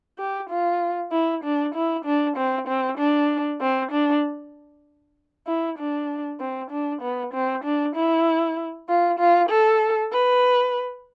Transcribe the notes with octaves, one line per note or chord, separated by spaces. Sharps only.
G4
F4
E4
D4
E4
D4
C4
C4
D4
C4
D4
E4
D4
C4
D4
B3
C4
D4
E4
F4
F4
A4
B4